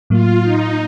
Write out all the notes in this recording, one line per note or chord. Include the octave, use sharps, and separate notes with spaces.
A2 F#3 A#3 F4
D#4